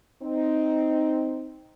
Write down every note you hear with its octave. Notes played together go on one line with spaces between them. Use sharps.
C4 D#4